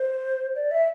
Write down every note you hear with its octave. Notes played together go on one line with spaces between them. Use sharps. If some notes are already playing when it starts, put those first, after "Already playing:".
Already playing: C5
D5
E5